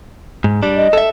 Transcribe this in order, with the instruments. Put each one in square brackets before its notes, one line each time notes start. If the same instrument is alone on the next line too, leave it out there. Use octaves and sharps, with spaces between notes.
[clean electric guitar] G#2
G3 D4
[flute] D#5
[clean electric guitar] A4 E5